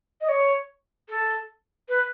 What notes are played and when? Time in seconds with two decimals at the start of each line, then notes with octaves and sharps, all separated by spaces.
0.21 D#5
0.29 C#5
1.09 A4
1.89 B4